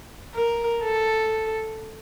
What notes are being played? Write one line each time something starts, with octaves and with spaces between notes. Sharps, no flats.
A#4
A4